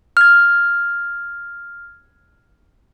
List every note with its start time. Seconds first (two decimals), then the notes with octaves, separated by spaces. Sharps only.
0.17 F6 G#6